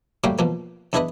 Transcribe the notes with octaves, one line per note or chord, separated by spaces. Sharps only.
A2 G3 A#3 F#4 F5 G5
B2 F3 A#3
E2 D4 E4 B4 D#5 B5